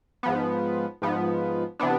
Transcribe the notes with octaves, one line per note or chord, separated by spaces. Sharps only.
G#2 F3 B3
G#2 F3 B3
C3 E3 B3 D4